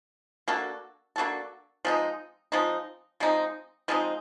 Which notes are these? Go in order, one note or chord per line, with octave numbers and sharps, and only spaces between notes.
A#3 D4 F#4 A4
A#3 D4 F#4 A4
F3 G#3 C4 D#4
F3 G#3 C4 D#4
F3 G#3 C4 D#4
F3 G#3 C4 D#4